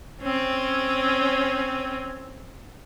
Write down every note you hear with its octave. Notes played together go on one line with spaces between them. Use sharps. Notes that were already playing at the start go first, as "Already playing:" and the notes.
C4 C#4